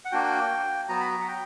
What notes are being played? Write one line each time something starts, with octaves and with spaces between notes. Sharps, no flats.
F#5
A#3 D4 F#4 G5
F#3 B3 F#4 A#5
B5
A#5
F#5
G5